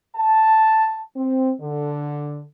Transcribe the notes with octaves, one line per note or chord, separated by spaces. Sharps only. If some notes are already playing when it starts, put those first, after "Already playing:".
A5
C4
D3